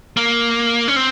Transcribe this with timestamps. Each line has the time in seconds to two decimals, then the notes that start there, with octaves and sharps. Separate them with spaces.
0.17 A#3
0.88 C#4
0.96 C4